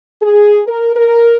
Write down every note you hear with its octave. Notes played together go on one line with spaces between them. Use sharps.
G#4
A#4
A#4